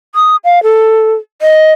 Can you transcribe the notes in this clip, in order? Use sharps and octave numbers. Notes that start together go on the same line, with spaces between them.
D#6
F5
A4
D#5